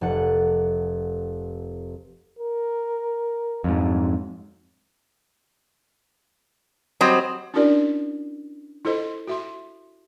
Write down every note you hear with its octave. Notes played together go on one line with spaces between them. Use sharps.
F1 A4 F#5
A#4
F2 G#2 F#3
F#3 G3 C4 C5 D#5
C#4 D4 E4 F#4 A#4 D5
E4 F4 A4 C5 D#5
F#4 E5 C6